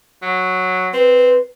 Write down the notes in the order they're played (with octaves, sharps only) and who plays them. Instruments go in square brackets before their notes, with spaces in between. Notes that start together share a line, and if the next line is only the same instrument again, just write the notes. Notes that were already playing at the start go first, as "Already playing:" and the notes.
[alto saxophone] F#3
[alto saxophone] C4 [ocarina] B4